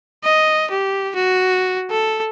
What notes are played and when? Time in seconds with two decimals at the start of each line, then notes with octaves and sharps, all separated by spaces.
0.24 D#5
0.71 G4
1.15 F#4
1.91 A4